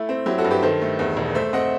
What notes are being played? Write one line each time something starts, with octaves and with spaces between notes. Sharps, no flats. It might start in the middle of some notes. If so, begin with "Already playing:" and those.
Already playing: A3 E4
C4
F#3 E4 G4
F#4 A4
G2
G4 B4
D#3 A4 C5
A3
E2
E1
A3 C5 E5
C4 D#5 F#5